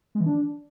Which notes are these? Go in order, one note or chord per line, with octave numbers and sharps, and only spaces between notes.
G#3
E3
D4